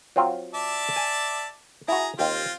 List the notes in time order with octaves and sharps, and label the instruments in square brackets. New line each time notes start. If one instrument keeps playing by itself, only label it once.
[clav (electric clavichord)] F#3 C4 F4
[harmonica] D5 E5 A5
[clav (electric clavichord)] G#5
[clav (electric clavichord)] E4 F#4 [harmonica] G#4 A#5
[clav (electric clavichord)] D#2 G4 [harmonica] C4 F4